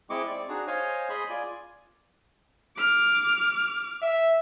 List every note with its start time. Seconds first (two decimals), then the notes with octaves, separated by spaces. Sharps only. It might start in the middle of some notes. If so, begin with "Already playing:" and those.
0.10 G#3 C4 E4 D#5 C#6 D6
0.27 C4 D5
0.49 D4 D#4 F#4 G#4
0.67 C5 C#5 D#5 F5 G#5
1.09 G#4 D#5 G#5 B5 C6
1.30 F4 D5 G#5
2.77 D6 F6
4.02 E5